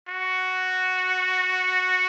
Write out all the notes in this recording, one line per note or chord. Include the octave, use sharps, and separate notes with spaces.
F#4